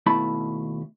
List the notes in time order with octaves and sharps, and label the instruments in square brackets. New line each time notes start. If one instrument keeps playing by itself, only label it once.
[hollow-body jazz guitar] D#2 B2 A3 E4 A5 B5